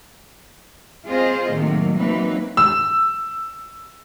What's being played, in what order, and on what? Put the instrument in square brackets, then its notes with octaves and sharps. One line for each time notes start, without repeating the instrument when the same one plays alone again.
[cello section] C4 F4 G#4 C5 D#5
A2 C3 D#3 F#3 A#3
E3 F#3 A#3 C4 D#4 B4
[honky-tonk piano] E6